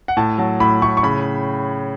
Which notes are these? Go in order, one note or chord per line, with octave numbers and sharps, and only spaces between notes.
F#5
A2 A5
F#3 A5
A2 B5
A2 C#6
C#6
C#3 B5